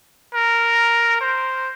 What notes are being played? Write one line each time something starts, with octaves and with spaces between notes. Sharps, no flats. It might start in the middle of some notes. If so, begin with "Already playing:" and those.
A#4
C5